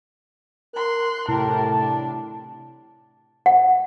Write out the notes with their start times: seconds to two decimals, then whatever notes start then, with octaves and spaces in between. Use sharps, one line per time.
0.74 A#4 C6 F#6
1.29 A2 C3 E4 G4 A#4 A5
1.75 D4
3.46 F#5